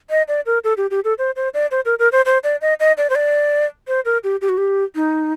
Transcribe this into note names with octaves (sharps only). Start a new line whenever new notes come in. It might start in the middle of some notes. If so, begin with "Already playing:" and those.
D#5
D5
A#4
A4
G4
G4
A4
C5
C5
D5
C5
A#4
A#4
C5
C5
D5
D#5
D#5
D5
C5
D5
C5
A#4
G4
G4
F#4
G4
D#4